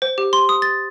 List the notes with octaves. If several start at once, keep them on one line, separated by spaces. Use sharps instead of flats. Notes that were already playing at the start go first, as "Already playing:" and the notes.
C5
G4
C6
D#6
A6